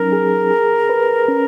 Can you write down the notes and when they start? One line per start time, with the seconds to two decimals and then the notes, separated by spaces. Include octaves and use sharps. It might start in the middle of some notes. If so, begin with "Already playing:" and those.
Already playing: F#3 C#4 D#4 A#4
0.12 G#4
0.51 G#4
0.89 B4
1.28 C#4